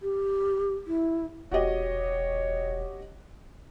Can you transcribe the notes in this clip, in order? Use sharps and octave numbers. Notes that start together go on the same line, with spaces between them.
G4
E4
E1 F#4 G4 C#5 D#5